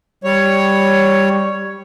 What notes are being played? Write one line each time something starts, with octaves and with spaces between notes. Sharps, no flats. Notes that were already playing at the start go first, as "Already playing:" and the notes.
G3 C#5